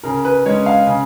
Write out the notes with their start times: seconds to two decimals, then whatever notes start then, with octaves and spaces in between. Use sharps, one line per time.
0.04 C#3 A#4
0.25 B4
0.46 G#3 C#4 C#5
0.66 F5
0.87 C#3